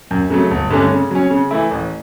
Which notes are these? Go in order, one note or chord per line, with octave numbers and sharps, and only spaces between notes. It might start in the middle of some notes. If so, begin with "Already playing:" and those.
F#2
C#3 F#3 A3
G1
G2 D3 A3 C#4
C#3
F#3 C#4
C#3
E3 A3 E4
A1